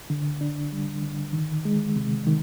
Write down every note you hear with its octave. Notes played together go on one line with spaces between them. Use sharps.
D3
D4
G3
D3
D#3
G#3
C3
D#3